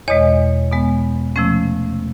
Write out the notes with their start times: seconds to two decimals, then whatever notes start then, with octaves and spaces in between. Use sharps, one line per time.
0.08 E2 B2 G#3 C#5 D#5
0.72 B2 G#3 B3
1.36 C3 F3 A3 C#4